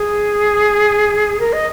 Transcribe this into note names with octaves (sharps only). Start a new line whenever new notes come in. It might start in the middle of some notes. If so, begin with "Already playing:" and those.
Already playing: G#4
A#4
D#5